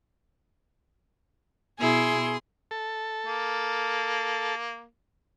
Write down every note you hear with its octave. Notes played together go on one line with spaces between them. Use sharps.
B2 E4 G#4 C6
A4
A#3